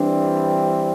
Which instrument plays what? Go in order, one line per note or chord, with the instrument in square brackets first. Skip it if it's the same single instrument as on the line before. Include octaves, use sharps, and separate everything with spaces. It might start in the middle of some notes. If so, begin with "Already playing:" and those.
Already playing: [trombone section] E3 G3 C4 [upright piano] D4